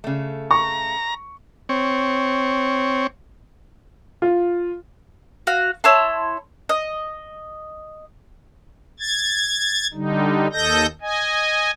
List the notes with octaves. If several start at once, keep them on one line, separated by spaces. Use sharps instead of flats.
C#3 A3
A#5 C#6
C4 C#5
F4
F#4 F5
E4 C#5 A5 C6
D#5
G#6 A6
D3 G3 D#4
D#2 A4 D#5 G6 A#6
D#5 G#5